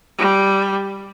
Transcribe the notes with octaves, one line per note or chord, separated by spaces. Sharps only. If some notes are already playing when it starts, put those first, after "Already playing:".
G3